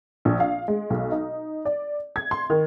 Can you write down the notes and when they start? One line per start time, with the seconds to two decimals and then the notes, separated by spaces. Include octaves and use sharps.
0.25 A#1
0.40 F5
0.68 G#3
0.90 B1
1.12 D#4
1.65 D5
2.16 G#6
2.31 C6
2.50 D#3